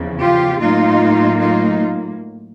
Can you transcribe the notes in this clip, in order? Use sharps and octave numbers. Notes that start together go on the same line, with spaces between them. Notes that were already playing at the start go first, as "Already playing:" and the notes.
Already playing: E2 C#3 F3
F4 G4
A2 F#3 A#3 D#4 F4
D#4 F4